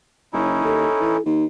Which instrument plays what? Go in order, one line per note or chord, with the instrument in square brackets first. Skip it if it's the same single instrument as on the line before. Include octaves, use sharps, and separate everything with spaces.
[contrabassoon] F#1 [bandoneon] C#4 D#4 E4
[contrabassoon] D#2 [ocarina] A4
[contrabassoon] E3
[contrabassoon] D#2 [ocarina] D#4